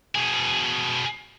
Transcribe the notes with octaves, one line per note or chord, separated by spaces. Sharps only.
B2 G#4